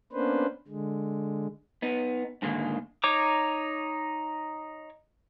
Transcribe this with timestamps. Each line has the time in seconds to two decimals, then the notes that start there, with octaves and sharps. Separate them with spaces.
0.13 A#3 B3 C#4 D4 B4 C5
0.68 D3 G#3
1.82 B3 D#4
2.42 G#2 D3 D#3 G#3 A#3
3.04 D#4 C#5 A#5 D6